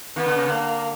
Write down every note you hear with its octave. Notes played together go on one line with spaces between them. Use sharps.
D#3 B3
D3
C#3
D3 A#3